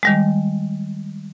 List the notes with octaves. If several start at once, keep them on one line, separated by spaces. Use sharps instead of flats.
D#3 G3 G#3